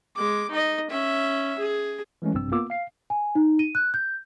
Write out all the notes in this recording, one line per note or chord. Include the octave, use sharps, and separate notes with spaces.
G#3 D6
D#4 D#5
C#4 E5
G#4
E3 G#3 A3 C#4
A#1 G2 C3 C4 E6
A#3 B3 F4 D6 E6
F5 C7
G#5
D#4
D#7
F#6
G6